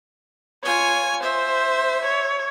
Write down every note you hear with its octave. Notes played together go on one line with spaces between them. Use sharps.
F4 C#5 G#5
C5 E5
C#5